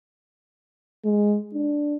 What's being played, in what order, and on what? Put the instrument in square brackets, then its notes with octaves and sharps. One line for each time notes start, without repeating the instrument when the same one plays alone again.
[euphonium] G#3
D4